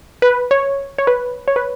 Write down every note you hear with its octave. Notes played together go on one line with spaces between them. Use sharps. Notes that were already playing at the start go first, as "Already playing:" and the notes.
B4
C#5
C#5
B4
C#5
B4